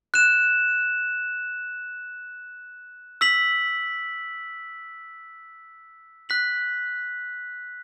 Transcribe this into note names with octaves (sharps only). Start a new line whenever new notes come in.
F#6 E7
E6 B6 F#7
F#6 B6 F#7